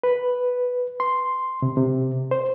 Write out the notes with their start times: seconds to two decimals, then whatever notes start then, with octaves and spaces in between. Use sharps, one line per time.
0.03 B4
1.00 C6
1.62 C3
1.77 C3
2.31 C5